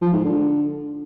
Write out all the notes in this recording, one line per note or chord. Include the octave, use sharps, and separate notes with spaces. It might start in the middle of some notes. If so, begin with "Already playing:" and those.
F3
G#2
D3